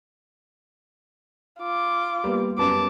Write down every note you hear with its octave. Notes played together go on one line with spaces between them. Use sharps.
F4 D6
G3 A#3 B3
F#2 G3 B3 A5 D6